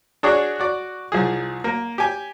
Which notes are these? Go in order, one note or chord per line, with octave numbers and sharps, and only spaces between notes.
D4 F#4 G#4 C#5 D5
F#4 D5
C2 F3 G#4
A#3
G4 G#5